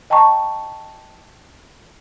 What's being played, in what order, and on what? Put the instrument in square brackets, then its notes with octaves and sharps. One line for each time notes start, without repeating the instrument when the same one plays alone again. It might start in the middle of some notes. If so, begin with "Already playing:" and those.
[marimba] D#5 G5 A5 A#5 C#6